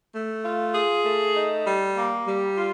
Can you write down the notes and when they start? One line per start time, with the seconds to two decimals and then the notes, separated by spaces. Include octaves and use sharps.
0.14 A3
0.44 F4
0.75 G#4
1.05 A3
1.35 D#4
1.66 G3
1.97 A#3
2.27 G3
2.57 F4